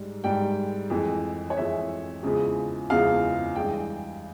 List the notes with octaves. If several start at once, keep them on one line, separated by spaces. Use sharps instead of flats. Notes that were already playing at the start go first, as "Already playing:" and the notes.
Already playing: G#2 G3
G#2 G3 G5
F2 E3 G#3
C#5
F2 E3 G#3 E5
E2 C#3 F3 G#3
E2 C#3 F3 G#3 F5
G2 E3 G#3 G5